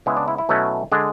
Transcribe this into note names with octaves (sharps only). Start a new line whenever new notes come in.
C#3 G#3 B3 E4
D4
E4
E4
B2 F#3 A3 C#4
D3 G#3 D4